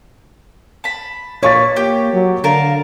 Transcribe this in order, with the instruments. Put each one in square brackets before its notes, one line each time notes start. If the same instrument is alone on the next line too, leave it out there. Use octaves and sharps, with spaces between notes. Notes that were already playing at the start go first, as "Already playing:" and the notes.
[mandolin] A5 B5
[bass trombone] A#2 [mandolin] A#3 B4 [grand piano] C#5 C#6 A6
[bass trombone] A#3 [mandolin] G4
[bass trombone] F#3
[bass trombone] D3 [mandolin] A#4 F5 A5